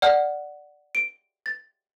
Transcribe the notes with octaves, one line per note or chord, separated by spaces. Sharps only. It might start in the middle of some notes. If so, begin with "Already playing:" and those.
D5 F#5 F6
D7
A6